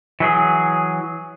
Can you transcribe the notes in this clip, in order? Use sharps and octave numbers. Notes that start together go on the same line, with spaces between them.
E3 F#3 G#4